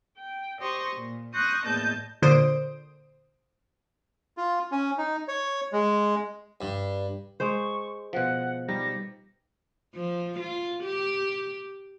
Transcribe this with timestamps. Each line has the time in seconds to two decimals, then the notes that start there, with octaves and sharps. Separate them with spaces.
0.18 G5
0.60 G4 C5 D#5 C6 C#6
0.94 A#2
1.33 C6 C#6 D#6 F#6 G6 A#6
1.64 E2 A2 A#3 D#5 A5 G6
2.22 A#2 D3 C5 D#6 D7
4.37 F4
4.72 C#4
4.98 D#4
5.28 C#5
5.73 G#3
6.61 G2
7.40 G#3 C5 C#6
8.13 B2 F3 F#5
8.68 G3 D#4 G4 A#6
9.95 F3
10.39 F4
10.83 G4